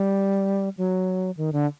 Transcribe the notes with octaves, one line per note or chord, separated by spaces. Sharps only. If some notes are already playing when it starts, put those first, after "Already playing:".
Already playing: G3
F#3
D#3
D3